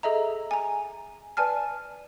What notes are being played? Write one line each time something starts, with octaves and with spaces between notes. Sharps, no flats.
G#4 A4 D#5 E5 A#5
G#5 A#5
B4 D5 G#5 A5 F6